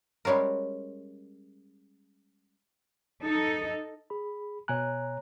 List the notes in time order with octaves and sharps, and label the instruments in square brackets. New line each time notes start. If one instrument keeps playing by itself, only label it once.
[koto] G3 G#3 C#4 F4 A#4
[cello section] D#4 A4
[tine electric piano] G#4 B5
[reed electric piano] B2 G#5 F#6 [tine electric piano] C#5 A#5